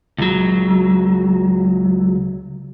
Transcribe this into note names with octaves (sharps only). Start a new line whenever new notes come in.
C#2 F#3